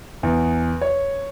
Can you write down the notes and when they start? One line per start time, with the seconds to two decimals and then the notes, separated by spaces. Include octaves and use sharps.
0.23 E2
0.81 C#5